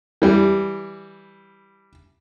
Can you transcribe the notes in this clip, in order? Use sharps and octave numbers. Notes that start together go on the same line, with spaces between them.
E3 G3